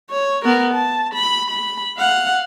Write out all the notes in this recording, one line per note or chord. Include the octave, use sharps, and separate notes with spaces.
C#5
B3 A#4
A5
B5
B5
F5 F#5